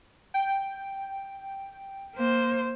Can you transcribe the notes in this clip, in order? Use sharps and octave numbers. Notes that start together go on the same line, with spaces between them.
G5
A#3 C5